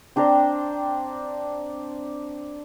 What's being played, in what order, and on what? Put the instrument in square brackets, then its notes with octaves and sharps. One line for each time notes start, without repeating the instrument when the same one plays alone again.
[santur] C4 D4 C5 A#5